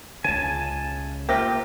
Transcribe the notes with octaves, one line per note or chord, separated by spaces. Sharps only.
C#2 C#3 G#5 A5
A#3 F4 G4 A#4 C5 E5